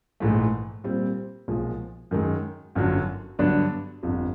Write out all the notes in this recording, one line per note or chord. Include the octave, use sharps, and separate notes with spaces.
A#1 G#2 E3 A3
A#2 G3 C4
B1 A#2 F3 G#3
F#2 D#3 G#3
G1 F#2 D3 F#3
G2 D3 F#3 B3 D4
G1 F2 C3 F3